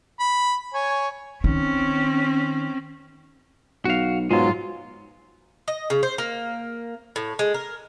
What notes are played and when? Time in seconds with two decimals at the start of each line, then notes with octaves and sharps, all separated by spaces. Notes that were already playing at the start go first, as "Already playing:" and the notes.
0.20 B5
0.74 C#5 G#5
1.44 D#3 C4 C#4
3.85 B1 F#4 F5
4.31 G#2 B2 F#3 G#3 F4
5.68 D#5
5.90 C#3
6.03 C5
6.18 A#3
7.16 A2
7.39 G#3
7.54 A#4